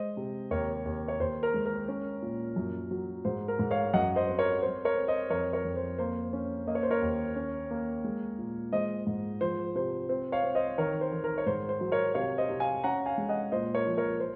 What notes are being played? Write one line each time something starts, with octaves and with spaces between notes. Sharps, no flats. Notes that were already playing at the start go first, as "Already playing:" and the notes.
Already playing: G#3 C5 D#5
C3
D#2 A#4 C#5
D#2
C#5
D#2 C5
A#4
G#3
A#4
C#4
A#2
F#2
F#3
G#2 C5
A#4
G#2
C#5 F5
F#2 D#5 F#5
C5 D#5
C4
A#4 C#5
C4 C5
A#4 C#5
C4
C5 D#5
F2 A#4 C#5
A#4 C#5
F2
C5
A#3 C5
C#4
A#3 D#5
C#5
C5
A#4 C#5
D#2
C#4
A#3
G#3
A#2
G#3 C5 D#5
G#2
F3 C5
C3 C5
C4 C5
C#5 F5
C4
C5 D#5
D#3 A#4 C#5
C5
D#3
A#4
C#5
G#2 C5
C5
F#3
A#4 C#5
C3 C#5 F5
C5 D#5
C3
F5 G#5
C#4 F#5 A#5
F5 G#5
G#3
D#5 F#5
A#2 C5 D#5
A#4 C#5
F3
A#4 C#5
C5